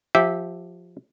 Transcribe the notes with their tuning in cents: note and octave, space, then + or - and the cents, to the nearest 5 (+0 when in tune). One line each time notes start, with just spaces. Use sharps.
F3 +15 G4 +5 E5 -10